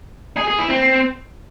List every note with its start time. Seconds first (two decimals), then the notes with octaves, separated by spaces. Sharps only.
0.37 G#4
0.48 G#4
0.59 E4
0.69 C4